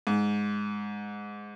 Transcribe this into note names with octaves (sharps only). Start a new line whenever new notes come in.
G#2